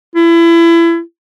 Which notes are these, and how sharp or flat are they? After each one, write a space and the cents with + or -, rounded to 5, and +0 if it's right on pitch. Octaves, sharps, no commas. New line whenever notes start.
E4 +30